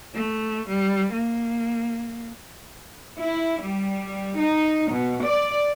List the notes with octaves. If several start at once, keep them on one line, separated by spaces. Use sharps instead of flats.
A3
G3
A#3
E4
G3
D#4
B2
D5